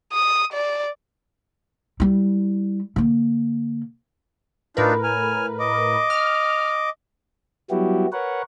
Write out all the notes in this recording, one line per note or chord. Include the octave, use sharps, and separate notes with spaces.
D#6
D5
G3 E4
D3 A#3
A2 D4 D#4 F4 A#4 B4
G#5 F6
D#5 D6
F6
F#3 G3 B3 E4 F#4 G4
A#4 B4 C#5 F#5